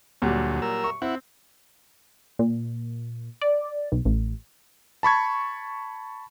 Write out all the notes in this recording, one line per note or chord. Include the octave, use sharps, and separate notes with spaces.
D2 A#2 F#3 G3
A#4 E6
C#6
C4 E4 F#5
A#2
D5
B1
A1
A5 B5 C#6 G#6